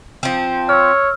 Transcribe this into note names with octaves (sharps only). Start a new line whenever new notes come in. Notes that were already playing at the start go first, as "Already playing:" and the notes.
F3 C4
C#5 E6 F6